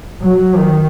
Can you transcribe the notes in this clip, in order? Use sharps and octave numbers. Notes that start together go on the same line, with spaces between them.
F#3
D#3